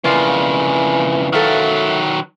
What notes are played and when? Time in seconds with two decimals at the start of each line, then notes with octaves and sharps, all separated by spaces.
0.04 F2 C#3 E3 A#3 F4 D5
1.33 D#3 F#3 A4 E5 F5